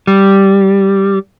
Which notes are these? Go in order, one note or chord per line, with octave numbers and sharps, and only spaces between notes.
G3